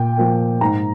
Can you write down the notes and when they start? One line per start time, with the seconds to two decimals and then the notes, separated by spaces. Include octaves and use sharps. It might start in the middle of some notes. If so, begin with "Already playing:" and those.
Already playing: A#2 G5
0.18 F3 A#3
0.61 G#2 A#5